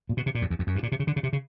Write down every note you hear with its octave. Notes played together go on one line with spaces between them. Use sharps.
A#2
B2
C3
A#2
F2
E2
F2
F#2
G2
A#2
C3
C#3
D3
C#3
C3
C#3